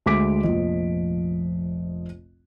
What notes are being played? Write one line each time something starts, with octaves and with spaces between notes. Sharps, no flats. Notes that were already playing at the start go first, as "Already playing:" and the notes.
D2 G#3 D6 B6 D7
F1 A#1 F3 D#5